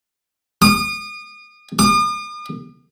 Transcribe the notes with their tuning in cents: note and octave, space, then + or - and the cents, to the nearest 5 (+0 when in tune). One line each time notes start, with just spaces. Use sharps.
D#6 -35
D#6 -45